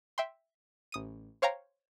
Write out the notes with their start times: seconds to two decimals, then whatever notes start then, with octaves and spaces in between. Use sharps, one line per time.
0.18 E5 G5 C6
0.92 A1 D#6 D#7
1.42 C5 C#5 F5 G5 A#5